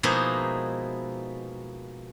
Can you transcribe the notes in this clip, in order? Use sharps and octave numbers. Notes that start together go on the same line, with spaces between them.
B2 F3 G#3 A#3 D#4 E4